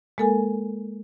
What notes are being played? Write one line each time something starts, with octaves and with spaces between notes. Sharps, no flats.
G#3 A#3 A4 A#4 G#5